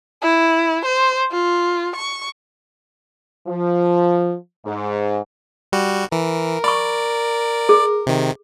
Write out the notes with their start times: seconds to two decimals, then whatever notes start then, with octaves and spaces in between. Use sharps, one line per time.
0.22 E4
0.85 C5
1.31 F4
1.96 C#6
3.48 F3
4.66 G#2
5.72 G3 F#4
6.12 E3 A#4
6.64 D5 B5 C#6
7.69 G#4
8.07 C3 D#3